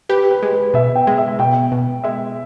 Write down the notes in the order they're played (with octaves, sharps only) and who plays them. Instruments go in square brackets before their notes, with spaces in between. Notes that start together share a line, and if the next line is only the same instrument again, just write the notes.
[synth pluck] G4 [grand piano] B4
[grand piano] B4
[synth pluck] G#3
[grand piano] B4
[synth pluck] B2 [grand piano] E5
[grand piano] G5
[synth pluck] G#3
[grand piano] E5
[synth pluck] B2 [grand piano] G5
[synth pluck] B2
[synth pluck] G#3 [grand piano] E5